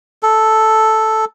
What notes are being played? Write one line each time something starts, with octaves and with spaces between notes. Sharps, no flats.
A4